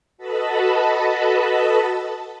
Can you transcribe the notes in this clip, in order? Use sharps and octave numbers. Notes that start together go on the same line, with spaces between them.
F#4 A4 B4 D#5 A5 B5